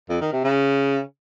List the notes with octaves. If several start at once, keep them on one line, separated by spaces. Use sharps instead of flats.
F2
D#3
C3
C#3